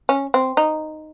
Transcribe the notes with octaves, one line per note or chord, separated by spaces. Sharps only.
C#4
C4
D#4